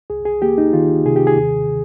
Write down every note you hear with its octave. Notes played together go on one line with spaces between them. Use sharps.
C2 G#4
G#4
A#3 G4
D#4
D#3 F4
C3 G#4
G4
G#4
D#2